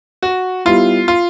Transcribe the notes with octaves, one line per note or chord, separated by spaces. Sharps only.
F#4
G3 B3 E4 F4
F4